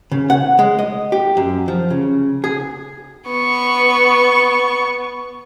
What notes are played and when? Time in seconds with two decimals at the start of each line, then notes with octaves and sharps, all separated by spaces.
0.12 C#3
0.30 F#5
0.59 G#3
0.79 D#5
1.12 G4
1.37 F#2
1.68 F3
1.90 C#3
2.44 G#4
3.29 B3 C#6